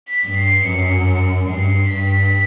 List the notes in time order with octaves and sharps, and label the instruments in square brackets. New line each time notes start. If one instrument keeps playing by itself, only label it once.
[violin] B6
[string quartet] G2
[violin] C7
[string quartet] F#2 [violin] C#7
[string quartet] G2 [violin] C7
[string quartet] G2 [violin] B6